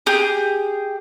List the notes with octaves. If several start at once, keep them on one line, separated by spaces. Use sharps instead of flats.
G4 G#4